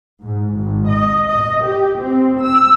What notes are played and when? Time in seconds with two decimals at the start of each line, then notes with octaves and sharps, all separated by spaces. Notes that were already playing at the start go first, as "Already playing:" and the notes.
0.23 G#2
0.55 G#1
0.88 D#5
1.28 D#5
1.64 G4
2.00 C4
2.42 E6